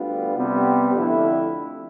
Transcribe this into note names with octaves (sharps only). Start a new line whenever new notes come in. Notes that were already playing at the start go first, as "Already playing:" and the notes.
Already playing: D2 D3 G3 B3 F4
C3 G3 B3
F2 D3 A3 E4